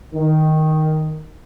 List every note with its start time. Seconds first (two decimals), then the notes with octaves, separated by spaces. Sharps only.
0.15 D#3